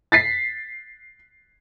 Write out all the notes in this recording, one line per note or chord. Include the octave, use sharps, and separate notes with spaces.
A6 B6 C7